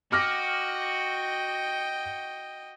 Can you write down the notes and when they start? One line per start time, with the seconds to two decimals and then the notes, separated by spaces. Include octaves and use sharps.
0.12 F#4 D#5 G5 D6 F6 A#6